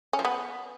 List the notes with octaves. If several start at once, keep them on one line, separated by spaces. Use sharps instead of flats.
C#4
F3
B3